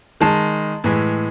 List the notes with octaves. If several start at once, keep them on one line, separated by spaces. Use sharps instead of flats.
D#3 G#3 A5
A2 E3 G#3